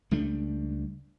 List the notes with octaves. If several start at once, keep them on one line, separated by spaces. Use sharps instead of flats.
C#2 G3 A3 D4